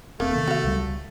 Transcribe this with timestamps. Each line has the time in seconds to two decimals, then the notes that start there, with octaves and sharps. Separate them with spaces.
0.20 E1 A3 A#3 C4
0.33 C3 D#3 B3
0.48 F#4 F5
0.64 C#2 G3